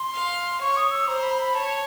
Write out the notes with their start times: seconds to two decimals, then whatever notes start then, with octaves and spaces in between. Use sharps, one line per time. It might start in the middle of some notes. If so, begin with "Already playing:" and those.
Already playing: C6
0.14 F5
0.61 C#5 C#6
0.77 D#6
0.91 E6
1.08 C5 A#5
1.23 B5
1.31 A#5
1.38 B5
1.54 C#5 A5